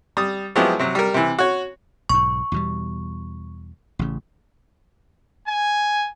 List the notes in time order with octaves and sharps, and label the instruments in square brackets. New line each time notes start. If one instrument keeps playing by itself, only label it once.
[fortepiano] G3 D#6
F3 F#3 G#3 B3 E4 G4
C3 F#3
G3 A#4
C3 E3
F#4 C#5
[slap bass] B1 G#2 [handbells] C#6
[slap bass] E2 B2 G3
A1 C#3
[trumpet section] G#5